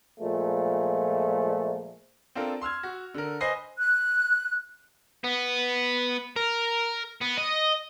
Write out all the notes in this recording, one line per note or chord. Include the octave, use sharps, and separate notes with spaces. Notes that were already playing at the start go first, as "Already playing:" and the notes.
A#2 F3 G#3 A3
C4 D4 F4 A4 A#4
C6 E6 F6 G#6
F#4
D3 A#4
B4 C5 D#5 G#5 A#6 C7
F#6
B3
A#4
B3
D#5